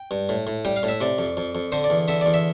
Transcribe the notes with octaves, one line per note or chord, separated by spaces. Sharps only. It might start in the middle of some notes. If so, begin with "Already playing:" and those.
Already playing: G5
G2
A2
A2
G3 G5
F5
A2
E5
C3 D5
F2
F2
F2
D3 C5
D5
E2
D3 E5
E2 D5
E5